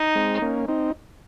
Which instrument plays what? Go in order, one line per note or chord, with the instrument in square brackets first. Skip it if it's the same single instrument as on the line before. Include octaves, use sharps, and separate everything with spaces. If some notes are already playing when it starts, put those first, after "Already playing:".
Already playing: [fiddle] D#4
[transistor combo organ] G#3 C4
A#3 C#4
C4 D#4